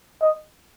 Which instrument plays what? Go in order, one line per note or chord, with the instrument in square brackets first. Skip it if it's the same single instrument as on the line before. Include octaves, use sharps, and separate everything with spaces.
[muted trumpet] D#5